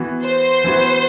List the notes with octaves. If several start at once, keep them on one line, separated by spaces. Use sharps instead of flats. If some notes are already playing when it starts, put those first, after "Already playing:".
Already playing: E3 B3 F#4
C5
E3 B3 F#4